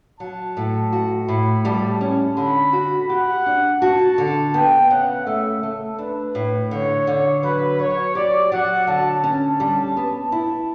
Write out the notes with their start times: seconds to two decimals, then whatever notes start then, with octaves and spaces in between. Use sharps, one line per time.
0.20 F#3 A5
0.57 A2
0.93 F#4
1.28 A2 B5
1.65 G3 A5
2.01 C#4
2.37 D3 B5
2.73 F#4
3.09 G4 F#5
3.46 D4
3.82 F#4 A5
4.18 D3
4.54 B3 G5
4.90 C#3 F#5
5.26 A3 E5
5.62 A3 A4
5.98 D4 B4
6.35 A2
6.71 D3 C#5
7.07 D3
7.43 F#3 B4
7.79 F#3 C#5
8.15 G4 D5
8.52 F#3 F#5
8.87 D3 A5
9.23 C#4 A5
9.60 G3 A5
9.97 B3
10.32 E4 A5